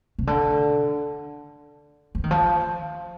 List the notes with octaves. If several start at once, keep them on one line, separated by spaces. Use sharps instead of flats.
C3
D3
F3
D#3
F3